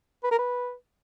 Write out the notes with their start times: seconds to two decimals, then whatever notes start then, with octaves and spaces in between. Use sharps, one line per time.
0.24 B4
0.31 A#4
0.38 B4